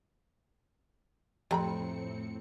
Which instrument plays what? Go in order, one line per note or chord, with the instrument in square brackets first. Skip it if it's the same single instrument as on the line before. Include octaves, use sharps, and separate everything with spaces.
[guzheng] F2 [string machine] A2 C4 C#7 [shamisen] G4 A#5 B5